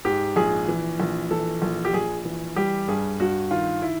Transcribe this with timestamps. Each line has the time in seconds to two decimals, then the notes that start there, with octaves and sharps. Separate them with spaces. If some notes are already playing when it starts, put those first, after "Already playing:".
0.05 G#2 G4
0.36 A#1 G#4
0.68 E3
1.00 A#1
1.31 E3 A4
1.62 A#1
1.85 G4
1.94 A#1 G#4
2.25 E3
2.56 G3 G4
2.88 G2 G#4
3.20 G2 F#4
3.51 D#3 F4
3.82 E4